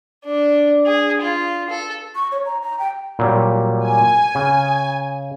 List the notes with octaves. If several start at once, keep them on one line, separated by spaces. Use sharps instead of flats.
D4
G#4
F4
A4
C#6
C#5
A#5
A#5
G5
A#2 F#3 G3
G#5
C#3